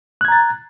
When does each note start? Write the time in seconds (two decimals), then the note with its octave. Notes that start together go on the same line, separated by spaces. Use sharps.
0.21 F#6
0.25 G#6
0.28 A#5
0.32 A6